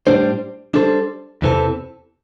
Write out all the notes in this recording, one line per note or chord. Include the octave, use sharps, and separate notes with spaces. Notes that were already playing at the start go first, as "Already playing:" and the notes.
A2 G3 D4 C5
G3 D4 A4 C5
E2 C3 E3 C4 A4